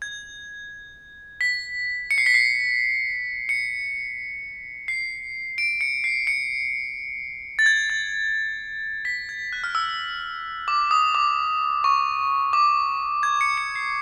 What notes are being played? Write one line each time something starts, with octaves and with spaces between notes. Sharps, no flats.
G#6
B6
C#7
C7
B6
C7
C#7
C7
D7
C#7
C7
C#7
A6
G#6
A6
B6
G#6
F#6
F6
E6
D6
D#6
D6
C#6
D6
G#6
C#7
C#7
C7